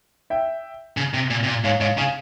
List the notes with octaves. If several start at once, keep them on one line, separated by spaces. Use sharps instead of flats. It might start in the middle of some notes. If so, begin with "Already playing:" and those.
E5 G5
C#3
C3
A#2
C3
A#2
G#2 C#5 F5
G#2 C#5 F5
C#3 F5 G#5